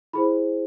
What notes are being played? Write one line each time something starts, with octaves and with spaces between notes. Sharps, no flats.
E4 G#4 C5 B5